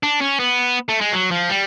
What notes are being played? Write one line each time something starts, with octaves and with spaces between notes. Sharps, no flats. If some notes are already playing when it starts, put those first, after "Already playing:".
D4
C#4
B3
A3
G#3
F#3
F3
G3